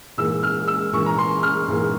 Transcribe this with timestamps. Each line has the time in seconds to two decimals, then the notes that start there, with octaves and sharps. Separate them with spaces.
0.18 A#1 G#2 E3 A#3 E6
0.43 F6
0.67 E6
0.93 A#1 G#2 E3 A#3 C#6
1.06 A#5
1.18 C6
1.43 F6
1.68 A#1 G#2 E3 A#3